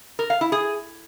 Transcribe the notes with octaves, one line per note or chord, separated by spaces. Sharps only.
A#4
F5
E4
G#4